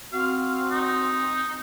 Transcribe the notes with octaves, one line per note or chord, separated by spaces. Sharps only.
C4 F#4 F5
D#4